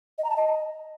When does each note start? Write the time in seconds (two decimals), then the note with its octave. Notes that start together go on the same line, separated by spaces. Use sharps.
0.18 D#5
0.24 A#5
0.30 A5
0.36 D#5